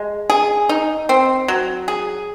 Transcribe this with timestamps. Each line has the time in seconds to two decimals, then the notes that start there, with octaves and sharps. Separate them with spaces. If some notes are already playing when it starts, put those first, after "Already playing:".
Already playing: G#3
0.30 G#4
0.69 D#4
1.09 C4
1.48 F#3
1.88 G#4